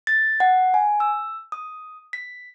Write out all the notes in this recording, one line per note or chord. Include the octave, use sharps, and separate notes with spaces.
A6
F#5
G#5
E6
D#6
B6